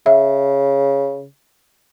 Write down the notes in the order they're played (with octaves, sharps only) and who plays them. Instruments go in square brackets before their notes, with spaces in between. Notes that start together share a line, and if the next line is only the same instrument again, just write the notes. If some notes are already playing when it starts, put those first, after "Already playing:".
[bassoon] C#3 [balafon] E5